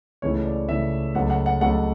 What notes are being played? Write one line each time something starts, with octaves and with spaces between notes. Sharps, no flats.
C#2 C#3 E3 A3 C#5
D5
C#2 C#3 E3 A3 E5
C#2 C#3 F#3 A3 F#5
F#5
F#5
C#2 C#3 F#3 A3 F#5